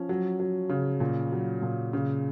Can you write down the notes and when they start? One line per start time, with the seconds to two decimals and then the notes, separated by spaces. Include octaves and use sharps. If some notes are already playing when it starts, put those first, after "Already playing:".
Already playing: F3 C#4
0.09 F#3
0.39 F#3
0.69 C#3
1.00 A#2
1.32 F#3
1.62 A#2
1.93 C#3